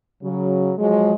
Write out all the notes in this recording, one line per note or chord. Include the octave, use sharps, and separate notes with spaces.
C#3 F#3
F3 F#3 G#3